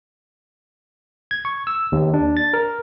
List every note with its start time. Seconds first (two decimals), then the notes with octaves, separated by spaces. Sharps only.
1.31 G#6
1.45 C#6
1.67 E6
1.92 D#2
2.14 D4
2.37 A6
2.54 A#4